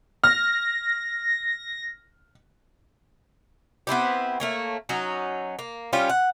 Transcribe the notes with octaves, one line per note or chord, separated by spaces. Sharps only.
F6 A#6
B3 C4 E4 G4
A3 A#3 C#5
F#3 C#4 D#4
A#3
G3 C#4 F4 G4
F#5